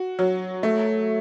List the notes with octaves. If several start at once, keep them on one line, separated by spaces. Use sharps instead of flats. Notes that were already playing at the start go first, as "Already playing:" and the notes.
Already playing: F#4
F#3
A3